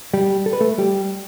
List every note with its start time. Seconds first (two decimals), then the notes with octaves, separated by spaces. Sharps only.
0.14 G3 G4
0.46 A4
0.53 B4
0.61 A3 A4
0.78 G3 G4